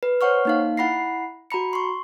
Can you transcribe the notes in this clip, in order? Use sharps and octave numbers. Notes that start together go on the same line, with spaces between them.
B4
C5 C#5 F#5 C#6 F6
A#3 D#4 F5
E4 F#5 B5 A#6 C7
F#4 A#5 B5 C#7
C6 C#6